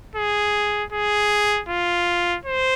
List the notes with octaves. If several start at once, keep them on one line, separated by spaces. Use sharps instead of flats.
G#4
G#4
F4
C5